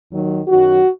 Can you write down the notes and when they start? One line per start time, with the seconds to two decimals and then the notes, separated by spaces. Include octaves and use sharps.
0.09 D#2 D#3 F#3
0.48 F#2 D#3 F#3 F#4